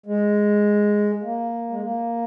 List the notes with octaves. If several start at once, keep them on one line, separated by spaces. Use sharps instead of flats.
G#3
A#3
G#3
A#3